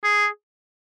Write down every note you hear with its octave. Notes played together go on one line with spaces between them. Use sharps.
G#4